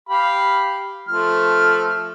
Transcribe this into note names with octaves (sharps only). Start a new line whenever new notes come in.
G4 F5 B5
F3 A3 F6